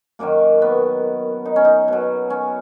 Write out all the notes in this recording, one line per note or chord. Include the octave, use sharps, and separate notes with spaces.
F#2 D#3 F#3 A#3
B3
D#4
C#4
D#4
B2 F#3
C#4